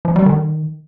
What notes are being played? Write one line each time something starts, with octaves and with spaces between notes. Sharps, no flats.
F3
G3
D#3